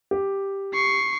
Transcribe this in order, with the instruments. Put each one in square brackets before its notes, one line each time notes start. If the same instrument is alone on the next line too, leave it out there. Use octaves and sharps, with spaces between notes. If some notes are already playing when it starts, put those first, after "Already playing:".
[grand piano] G4
[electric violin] C#6 C7